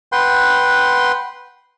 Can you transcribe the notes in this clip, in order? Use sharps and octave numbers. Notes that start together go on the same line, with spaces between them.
B4 F#5 G5 C6